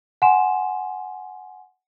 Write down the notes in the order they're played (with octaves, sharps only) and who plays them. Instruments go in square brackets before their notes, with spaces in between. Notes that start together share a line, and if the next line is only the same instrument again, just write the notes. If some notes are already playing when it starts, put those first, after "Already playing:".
[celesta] F#5 G#5 C6 E7